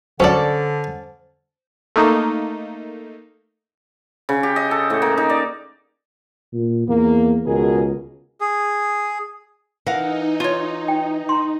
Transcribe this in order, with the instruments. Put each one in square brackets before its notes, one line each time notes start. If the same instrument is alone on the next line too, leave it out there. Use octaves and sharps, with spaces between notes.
[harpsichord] F#2 D4 [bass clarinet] D3 [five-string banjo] C#4 A4 D5 [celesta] C5
[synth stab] A3 A#3 D#4
[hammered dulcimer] C#3
G4
D#5
A4
A2
A#3
D#4
D5
[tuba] A#2
[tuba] E2 [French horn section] A#3
[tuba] C#2 [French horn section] B2 G#4 A#4
[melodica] G#4
[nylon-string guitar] E3 [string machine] D#4 [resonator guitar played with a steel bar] A#4 F5 F#5
[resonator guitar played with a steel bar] F4 C#5
[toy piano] G5
A#5 C6